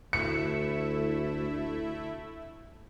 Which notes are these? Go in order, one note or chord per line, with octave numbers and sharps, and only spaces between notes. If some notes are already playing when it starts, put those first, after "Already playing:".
D2 A3 E4 E5 C#7